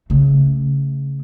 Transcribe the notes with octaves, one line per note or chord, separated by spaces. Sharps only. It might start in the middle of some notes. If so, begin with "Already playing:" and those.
C#3 A3